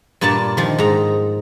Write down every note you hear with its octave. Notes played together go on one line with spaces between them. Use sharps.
G2 A#2 A#3 D5 A5
D#3 F3
G#2 A#5